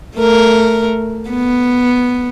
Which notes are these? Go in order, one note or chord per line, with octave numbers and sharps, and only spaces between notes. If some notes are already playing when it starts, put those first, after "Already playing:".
A3 A#4
B3